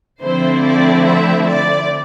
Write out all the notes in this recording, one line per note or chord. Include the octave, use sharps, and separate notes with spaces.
D3 F3 A3 C4 E4 C5
D5
E5
D5